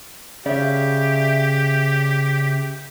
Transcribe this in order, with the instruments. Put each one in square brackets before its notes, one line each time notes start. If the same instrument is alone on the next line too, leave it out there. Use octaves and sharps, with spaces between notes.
[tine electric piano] C#3 [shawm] G4 [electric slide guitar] D5 E5